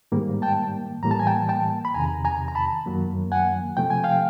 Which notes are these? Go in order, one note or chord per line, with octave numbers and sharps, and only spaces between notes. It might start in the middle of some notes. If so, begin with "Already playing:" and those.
G#2 D#3 G3 A#3
G5 A5
A2 E3 G3 A#3 A#5
A5
G#5
G5 A5
G5 A5
B5
E2 C3 D#3 G#5 A#5
G#5 A#5
A#5
A5 B5
F#2 D#3 F#3 A#3
F#5 G#5
C3 F3 A3 G5
G#5
F5 G5